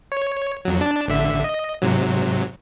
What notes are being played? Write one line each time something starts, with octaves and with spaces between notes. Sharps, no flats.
C#5
F2 F#3
D4 A5
A1 D3 E5
D#5
G#2 C3 F#3